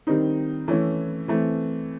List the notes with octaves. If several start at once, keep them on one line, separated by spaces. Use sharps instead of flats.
D#3 G3 C4 D#4
E3 A3 C#4 E4
E3 A3 C4